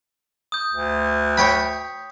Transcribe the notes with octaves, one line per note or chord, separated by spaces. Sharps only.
D#6 G6
D2
C#5 G5 B5